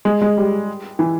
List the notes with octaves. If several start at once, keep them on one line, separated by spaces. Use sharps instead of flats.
G#3
G#3
G3
E3